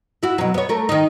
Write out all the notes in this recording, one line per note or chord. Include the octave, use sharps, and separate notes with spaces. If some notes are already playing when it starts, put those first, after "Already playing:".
E4 F#4
B2 F#3
B3 C#5
A3 A#4
D#3 D#4